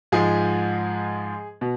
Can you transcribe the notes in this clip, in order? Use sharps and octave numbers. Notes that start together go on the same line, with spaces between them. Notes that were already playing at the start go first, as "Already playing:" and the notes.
G#2 F3 G#3 G#4
B2